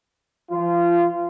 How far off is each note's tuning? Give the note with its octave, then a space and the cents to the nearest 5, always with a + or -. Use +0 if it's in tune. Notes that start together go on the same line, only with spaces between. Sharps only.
F3 -30 F4 -20